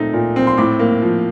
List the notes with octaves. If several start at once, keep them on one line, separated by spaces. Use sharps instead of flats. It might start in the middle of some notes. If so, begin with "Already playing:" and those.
Already playing: A#2 A3 C4 D#4
A#2
C4
C6
A2 D6
A#3
F3